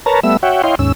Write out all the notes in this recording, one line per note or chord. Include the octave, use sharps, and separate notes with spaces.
A#4 B4 C#5 A5 A#5
G3 A3 B3 E5 E6
F#4 C#5 E5 F#5 G5
E4 C#5 D#5 F5 G5 C6
D#2 G#2 C#4 E6